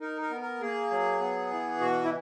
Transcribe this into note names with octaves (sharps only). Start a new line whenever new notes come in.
D#4 A#4
A#4
B3
A#4
A#3 G#4
F#3
B3
E3
B2 F#4
E4